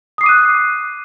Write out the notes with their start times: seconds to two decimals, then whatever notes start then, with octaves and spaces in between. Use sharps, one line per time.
0.18 D#6
0.21 C7
0.24 D6
0.26 D#7
0.29 F#6